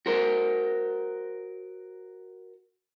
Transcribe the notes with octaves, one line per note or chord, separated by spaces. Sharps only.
F#4 A#4 C5